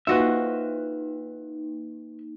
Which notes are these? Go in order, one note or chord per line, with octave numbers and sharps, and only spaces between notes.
A#3 D#4 F4 F#4 B4 C5 D#5 E5